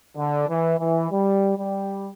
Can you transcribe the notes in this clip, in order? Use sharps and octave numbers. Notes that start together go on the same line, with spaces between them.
D3
E3
E3
G3
G3